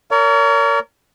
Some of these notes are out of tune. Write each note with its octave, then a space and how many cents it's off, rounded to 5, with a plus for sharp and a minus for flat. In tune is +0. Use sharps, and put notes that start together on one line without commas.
A#4 -20 C#5 +40